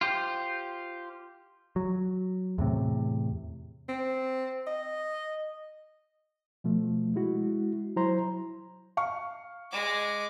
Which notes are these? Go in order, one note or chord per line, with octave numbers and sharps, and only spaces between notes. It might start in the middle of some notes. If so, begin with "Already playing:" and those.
F4 G4 C5
F#3
E2 A2 C3
C4
D#5
B2 F3 A3
G#3 E4 F#4
F#3 E4 C5 A#5 C6
F5 C#6
G#3 D6